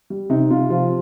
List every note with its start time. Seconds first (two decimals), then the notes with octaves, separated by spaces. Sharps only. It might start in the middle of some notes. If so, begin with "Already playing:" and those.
0.10 G3
0.30 C3 D#4
0.50 C3 F4
0.70 F3 F4